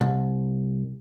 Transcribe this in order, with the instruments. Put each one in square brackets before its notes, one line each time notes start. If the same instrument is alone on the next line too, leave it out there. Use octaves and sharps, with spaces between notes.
[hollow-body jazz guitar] C2